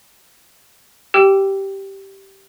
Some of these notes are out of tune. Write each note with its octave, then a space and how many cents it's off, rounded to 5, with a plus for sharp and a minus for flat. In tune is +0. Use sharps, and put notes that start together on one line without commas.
G4 -10 G5 +0 E6 +30